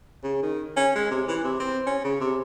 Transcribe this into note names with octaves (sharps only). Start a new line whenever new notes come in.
C#3
D#3
C#4
G#3
C3
E3
C3
C4
C#4
C#3
C3